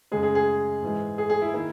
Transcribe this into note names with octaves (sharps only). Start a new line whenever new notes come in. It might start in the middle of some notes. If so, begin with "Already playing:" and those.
F#2 C#3 G#3 G#4
G#4
G#4
G#2 E3 G#3
G#4
G#4
E4
D#3 A#3 E4